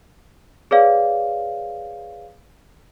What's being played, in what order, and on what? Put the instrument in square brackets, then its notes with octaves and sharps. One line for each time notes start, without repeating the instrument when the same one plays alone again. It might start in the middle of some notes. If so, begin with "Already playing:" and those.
[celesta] G#4 B4 C#5 D5 F5